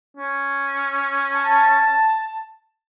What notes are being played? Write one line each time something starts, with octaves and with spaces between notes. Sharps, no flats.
C#4
A5